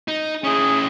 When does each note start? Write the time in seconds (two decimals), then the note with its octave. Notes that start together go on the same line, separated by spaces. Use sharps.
0.08 D#4
0.44 C#4 E4 G#4